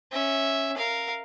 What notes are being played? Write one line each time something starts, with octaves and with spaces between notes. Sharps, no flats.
C#4 E5
A#4 F5